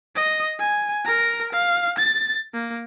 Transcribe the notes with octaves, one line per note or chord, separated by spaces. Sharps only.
D#5
G#5
A#4 A#5
F5
A6
A#3